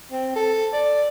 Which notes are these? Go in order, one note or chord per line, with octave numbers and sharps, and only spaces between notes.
C4
A4
D5